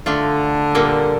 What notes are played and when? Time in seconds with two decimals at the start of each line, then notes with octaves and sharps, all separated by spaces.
0.06 D3 A3 D4 F4
0.75 A#2 G3 A#3